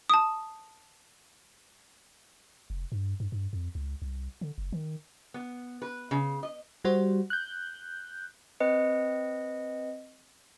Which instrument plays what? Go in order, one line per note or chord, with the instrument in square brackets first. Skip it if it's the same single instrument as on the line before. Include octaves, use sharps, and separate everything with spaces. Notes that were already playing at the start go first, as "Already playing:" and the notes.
[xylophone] A5 D#6
[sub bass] F1
G2
G2
G2
F2
C#2
C2
D3
F#1
D#3
[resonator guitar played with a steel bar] B3
B4
C#3
D#5
[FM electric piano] G3 F#4 C5
F#6 G6
[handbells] C4 B4 D#5 C#7